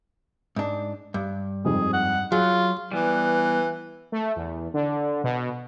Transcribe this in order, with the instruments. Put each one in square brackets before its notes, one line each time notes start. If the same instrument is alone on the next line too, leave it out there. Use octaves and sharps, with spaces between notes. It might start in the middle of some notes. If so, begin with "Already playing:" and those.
[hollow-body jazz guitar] G#2 D4
G2
[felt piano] F2 G#2 G3 [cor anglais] G#4
[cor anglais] F#5
[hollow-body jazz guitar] F#3 [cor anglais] F4 [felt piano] G#4
[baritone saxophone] E3 [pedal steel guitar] G3 B3
[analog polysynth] A3
E2
D3
B2